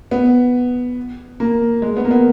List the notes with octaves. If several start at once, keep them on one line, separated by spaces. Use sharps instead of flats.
B3
A#3
G#3
B3
A#3
B3